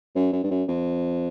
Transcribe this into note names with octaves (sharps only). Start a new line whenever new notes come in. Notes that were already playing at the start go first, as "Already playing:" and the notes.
F#2
F#2
G2
F#2
F2